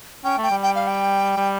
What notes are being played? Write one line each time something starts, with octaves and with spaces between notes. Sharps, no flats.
C#4 G5
A3
G5
G3
G5
F5
G5
G3